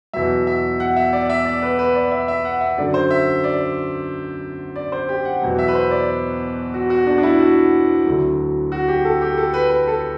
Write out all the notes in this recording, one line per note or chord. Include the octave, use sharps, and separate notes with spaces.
E2 B2 F#3 E5
E5
F#5
E5
D5
E5
D5
B4
B4
D5
E5
E5
F#5
E5
F#2 D3 F#3 D5
C5
E5
D5
D5
C5
G4
F#5
E2 B2 F#3
E5
B4
C5
D5
F#4
F#4
D4
D4
E4
F#4
D2 D3 F#3
F#4
G4
A4
G4
A4
B4
B4
A4